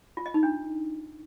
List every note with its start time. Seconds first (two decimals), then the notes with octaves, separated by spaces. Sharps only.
0.17 F4
0.26 D#5
0.34 D#4
0.43 D4